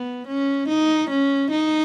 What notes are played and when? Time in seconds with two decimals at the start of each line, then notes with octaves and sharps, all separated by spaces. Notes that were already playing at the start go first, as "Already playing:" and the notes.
Already playing: B3
0.27 C#4
0.68 D#4
1.10 C#4
1.51 D#4